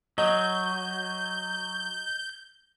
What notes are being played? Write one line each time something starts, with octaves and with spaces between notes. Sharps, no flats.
F#3 D#5 G6